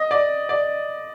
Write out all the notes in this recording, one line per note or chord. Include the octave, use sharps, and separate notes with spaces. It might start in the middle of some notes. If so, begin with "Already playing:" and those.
Already playing: D#5
D5
D5